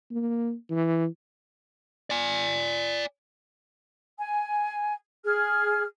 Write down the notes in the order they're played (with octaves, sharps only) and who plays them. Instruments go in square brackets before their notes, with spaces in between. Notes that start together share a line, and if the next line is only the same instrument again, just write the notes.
[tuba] A#3
E3
[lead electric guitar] D5 G#5
[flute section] G#5
G#4 F6